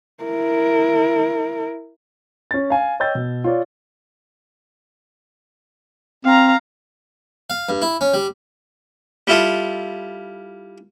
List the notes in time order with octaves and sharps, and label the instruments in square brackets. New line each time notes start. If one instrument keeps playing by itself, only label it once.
[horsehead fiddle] E4 A#4
[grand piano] C#4 A6
F5 G#5
C#5 D#5 G5 E6 G6 A6
B2
F4 C#5 D5
[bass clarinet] C4 [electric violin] F5 A#5
[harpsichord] F5
G2
E4
C#4
G3
G3 E4 F4 A4 D#6